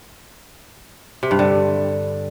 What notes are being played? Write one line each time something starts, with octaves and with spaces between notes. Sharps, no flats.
C3
G2
D3